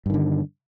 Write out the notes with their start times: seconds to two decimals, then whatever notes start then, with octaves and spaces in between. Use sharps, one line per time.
0.06 G2
0.10 D#3
0.14 D3